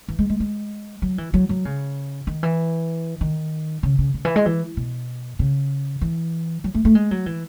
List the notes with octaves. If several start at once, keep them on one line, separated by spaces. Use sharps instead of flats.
E3
G#3
G#3
G#3
F#3
E3
F#3
F#3
C#3
D#3
E3
D#3
C#3
C#3
C#3
E3
G#3
E3
B2
C#3
E3
F#3
A3
A3
G#3
F#3
E3